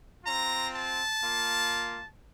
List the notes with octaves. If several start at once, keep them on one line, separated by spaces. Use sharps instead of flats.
C4 F4 A#5
A5
A#3 F4